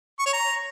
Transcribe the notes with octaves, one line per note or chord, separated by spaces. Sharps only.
C#6
C#5
A#5